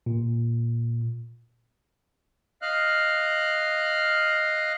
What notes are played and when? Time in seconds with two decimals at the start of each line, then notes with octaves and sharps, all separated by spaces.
0.06 A#2
2.62 D#5 F5 F6 F#6